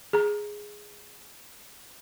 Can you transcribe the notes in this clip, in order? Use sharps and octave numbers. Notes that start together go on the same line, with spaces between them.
G#4 A#5